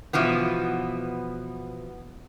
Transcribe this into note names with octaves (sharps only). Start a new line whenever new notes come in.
B2 E3 F3 B3